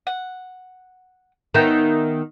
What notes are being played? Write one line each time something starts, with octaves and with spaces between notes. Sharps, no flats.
F#5
D#3 B3 D#4 E5 G5